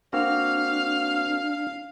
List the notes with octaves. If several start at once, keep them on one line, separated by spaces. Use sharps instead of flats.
A#3 C4 D4 F#4 F5 F6